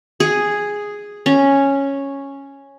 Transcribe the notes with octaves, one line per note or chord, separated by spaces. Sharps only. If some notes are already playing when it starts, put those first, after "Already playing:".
G#4
C#4